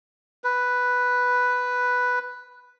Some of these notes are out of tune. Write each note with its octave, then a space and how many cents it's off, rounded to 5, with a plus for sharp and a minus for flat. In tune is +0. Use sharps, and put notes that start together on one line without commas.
B4 +0